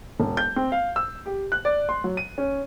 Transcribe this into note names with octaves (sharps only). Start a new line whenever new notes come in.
E1
G6
C4
F5
E6
G4
F#6
D5
C6
F#3
D#7
C#4